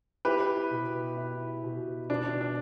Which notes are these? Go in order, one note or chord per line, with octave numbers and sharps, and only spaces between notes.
E4 G4 B4
B2
E4
B2
B2 D4
D4